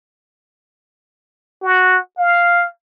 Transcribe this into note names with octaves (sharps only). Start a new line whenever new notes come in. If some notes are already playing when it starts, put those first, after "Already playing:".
F#4
F5